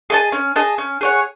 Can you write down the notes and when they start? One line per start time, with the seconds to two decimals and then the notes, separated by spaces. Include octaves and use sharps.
0.10 G#4 D#5 A5
0.32 C#4
0.56 G#4 D#5 A5
0.78 C#4
1.01 G#4 C#5 F#5